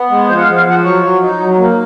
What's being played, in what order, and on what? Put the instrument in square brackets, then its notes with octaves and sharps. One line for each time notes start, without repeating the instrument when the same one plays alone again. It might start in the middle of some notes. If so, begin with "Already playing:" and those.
Already playing: [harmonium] B3
G#3
F3 C5
F#5
F5
F3
F5
F3 F#5
F#3 C#5
F#3
D#4
F#3
A#3